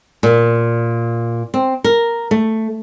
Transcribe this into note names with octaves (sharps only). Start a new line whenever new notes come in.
A#2
C4
A#4
A3